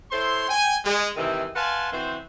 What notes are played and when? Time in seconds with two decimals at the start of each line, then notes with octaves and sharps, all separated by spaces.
0.11 E4 A4 C5 C#5 C6
0.48 G5 G#5
0.85 G#3
1.16 C3 D#3 E3 G#3 C4
1.55 B4 F5 F#5 G#5 A5 C6
1.92 E3 C4 F#4 C5